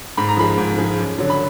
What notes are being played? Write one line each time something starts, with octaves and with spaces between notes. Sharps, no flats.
G#2 B5
A#5
F3 G#3 B5
G#2
F3 G#3
F#2
D3 F#3
B5